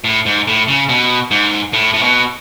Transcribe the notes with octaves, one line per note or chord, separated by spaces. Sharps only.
A2
G#2
A2
C#3
B2
G#2
A2
A2
B2